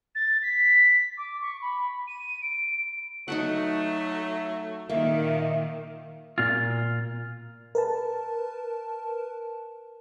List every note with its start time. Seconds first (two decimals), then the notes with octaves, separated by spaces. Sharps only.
0.15 A6
0.42 B6
1.17 D6
1.41 C#6
1.62 B5
2.07 D#7
2.42 D7
3.28 F#3 A3 D#4 F#4 F#5
4.90 A#2 D#3 A#3 E5
6.38 A#2 F4
7.75 A#4 B4 A5